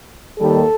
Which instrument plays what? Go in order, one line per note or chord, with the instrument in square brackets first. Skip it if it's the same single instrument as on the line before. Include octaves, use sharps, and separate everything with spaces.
[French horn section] D#2 D#3 G3 A#3 A4